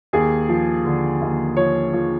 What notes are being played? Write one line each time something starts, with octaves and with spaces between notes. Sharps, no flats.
D#2 G#4
F3
D3
D#2
F3 C#5
F3